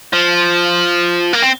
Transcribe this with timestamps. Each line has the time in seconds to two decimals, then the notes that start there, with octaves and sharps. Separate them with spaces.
0.13 F3
1.33 A#3
1.42 C4